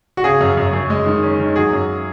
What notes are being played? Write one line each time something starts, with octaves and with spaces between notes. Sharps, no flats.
F#4
C#3 G#4
F#2
F#2
F#2
G#3
D#3
C#4
D#3
F#3 G#4
F#2